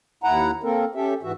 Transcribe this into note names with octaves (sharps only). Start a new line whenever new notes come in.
D#2 E4 F#5 A#5
A#3 C4 A4 A#4
C#4 G4 A4 E5
G#2 E3 F#4 E5